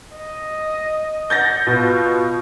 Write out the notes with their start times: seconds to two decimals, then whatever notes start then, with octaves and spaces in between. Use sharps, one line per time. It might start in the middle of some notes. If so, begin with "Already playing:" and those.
0.15 D#5
1.30 F#5 G6 A6 A#6
1.67 B2 F4